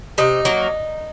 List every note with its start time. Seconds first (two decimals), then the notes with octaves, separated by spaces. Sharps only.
0.18 C3 D#4
0.45 F#3 A#3